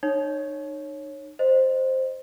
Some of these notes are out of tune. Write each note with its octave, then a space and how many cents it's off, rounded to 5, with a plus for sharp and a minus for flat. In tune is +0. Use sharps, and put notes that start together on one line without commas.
D#4 -35 C#5 -5
C5 +0 D#5 -10